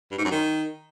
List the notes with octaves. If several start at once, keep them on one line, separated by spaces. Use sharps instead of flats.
G2
G#2
F#2
D#3